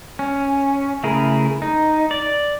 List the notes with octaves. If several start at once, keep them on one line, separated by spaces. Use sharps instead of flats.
C#4
C#3 A3 E4 G#4 A#4
D#4
D5